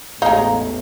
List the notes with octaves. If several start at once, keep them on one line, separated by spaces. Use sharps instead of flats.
A1 E2 A2 G#3 D#4 F5 A#5